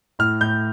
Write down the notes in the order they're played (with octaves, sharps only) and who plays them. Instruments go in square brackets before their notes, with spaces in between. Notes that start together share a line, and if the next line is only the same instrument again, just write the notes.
[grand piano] A2 F6
A2 G6